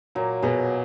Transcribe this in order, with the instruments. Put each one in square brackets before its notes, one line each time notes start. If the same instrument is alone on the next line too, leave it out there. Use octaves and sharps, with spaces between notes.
[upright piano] A#2 A#3 [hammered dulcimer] F#3
[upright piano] B2 B3 [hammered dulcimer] G#4